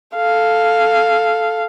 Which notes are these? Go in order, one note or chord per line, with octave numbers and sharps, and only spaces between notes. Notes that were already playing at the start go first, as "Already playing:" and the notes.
A4 F5